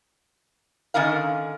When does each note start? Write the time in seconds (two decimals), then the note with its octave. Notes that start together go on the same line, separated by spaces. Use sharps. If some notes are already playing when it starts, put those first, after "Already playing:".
0.94 D3 D#3 C#4 E4 A#4 F5